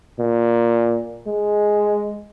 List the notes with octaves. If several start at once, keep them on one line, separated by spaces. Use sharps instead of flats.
A#2
G#3